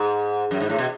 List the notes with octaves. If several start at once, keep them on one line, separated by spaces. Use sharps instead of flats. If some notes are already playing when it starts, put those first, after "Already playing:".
Already playing: G#2
F#2
G#2
A2
B2